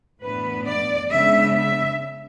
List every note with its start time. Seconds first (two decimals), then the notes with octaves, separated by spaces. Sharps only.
0.22 A2 E3 B3 D4 B4
0.66 D5
1.10 C#3 G#3 B3 D4 E5
1.55 E5